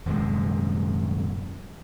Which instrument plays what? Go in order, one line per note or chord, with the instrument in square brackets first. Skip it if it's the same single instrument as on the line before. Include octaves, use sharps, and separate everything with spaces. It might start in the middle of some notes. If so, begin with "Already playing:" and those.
[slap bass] D#1 F#2 C3 G#3